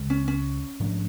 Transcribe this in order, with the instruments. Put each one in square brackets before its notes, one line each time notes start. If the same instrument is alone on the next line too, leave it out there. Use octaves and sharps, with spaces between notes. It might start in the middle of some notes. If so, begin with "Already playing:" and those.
Already playing: [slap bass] C#2 C#3 G#3
[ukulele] C#4
C#4
[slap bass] G#2 F3 A3 D4